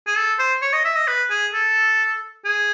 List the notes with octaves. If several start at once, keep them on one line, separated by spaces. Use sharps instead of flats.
G#4
A4
C5
C#5
D#5
E5
D#5
B4
G#4
A4
G#4